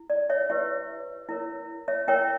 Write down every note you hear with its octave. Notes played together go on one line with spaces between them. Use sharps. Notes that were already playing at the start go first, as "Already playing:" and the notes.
Already playing: E4
D5
C#5 E5
E4 G4 B4 C#5 E5
E4 A#4 C#5
C#5 E5
E4 A#4 C#5 E5 G5